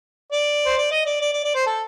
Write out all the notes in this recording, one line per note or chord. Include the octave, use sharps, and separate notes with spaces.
D5
C5
D5
D#5
D5
D5
D5
D5
C5
A4